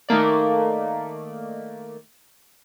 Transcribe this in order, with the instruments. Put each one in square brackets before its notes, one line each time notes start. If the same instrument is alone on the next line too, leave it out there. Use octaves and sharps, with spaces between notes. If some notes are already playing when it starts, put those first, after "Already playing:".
[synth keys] D#3 A3 A#3 D5